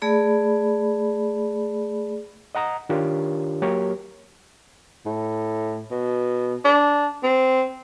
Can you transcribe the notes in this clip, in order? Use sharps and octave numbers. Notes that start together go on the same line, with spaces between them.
A3 G#4 D5 B5
D#5 F#5 A#5 D#6
D#3 D4 F4 G4 A#4 C#5
F#3 A#3 G4 A#4 C#5
A2
B2
D4
C4